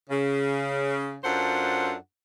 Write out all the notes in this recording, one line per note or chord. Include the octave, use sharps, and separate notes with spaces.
C#3
F#2 D4 F4 A4 C5 F#5